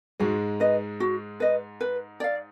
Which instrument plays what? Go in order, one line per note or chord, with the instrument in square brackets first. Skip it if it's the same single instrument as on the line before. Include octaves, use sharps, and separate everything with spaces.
[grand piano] G#2 G#3 [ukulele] F#4
[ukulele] B4 D#5
F#4
B4 D#5
B4
D5 F5